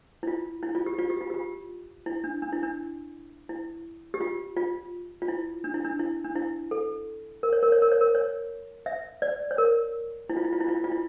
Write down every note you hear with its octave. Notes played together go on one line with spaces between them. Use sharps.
E4
F4
E4
F4
G4
F4
G4
F4
G4
F4
E4
D4
D4
E4
D4
E4
G4
F4
F4
F4
E4
D4
E4
D4
E4
D4
E4
A4
A#4
C#5
A#4
C#5
A#4
C#5
A#4
C#5
E5
D5
C#5
A#4
E4
F4
E4
F4
E4
F4
E4
F4
E4